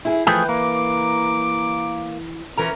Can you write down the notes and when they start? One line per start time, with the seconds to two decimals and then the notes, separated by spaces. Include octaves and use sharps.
0.05 E4 G#4
0.27 E3 F3 A3 G#4 G5
0.49 A#3 D6
2.57 E3 C#4 A#4 A#5